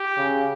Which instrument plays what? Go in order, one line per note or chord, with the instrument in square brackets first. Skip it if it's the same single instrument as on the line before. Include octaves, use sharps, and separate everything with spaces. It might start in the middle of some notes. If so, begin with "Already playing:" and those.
Already playing: [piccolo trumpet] G4
[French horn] C#3